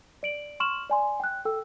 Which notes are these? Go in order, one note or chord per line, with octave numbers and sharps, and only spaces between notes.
D5 D7 F#7
C6 C#6 F6 E7 F#7
D5 G#5 C6
G5 F#6
A4 G5 E6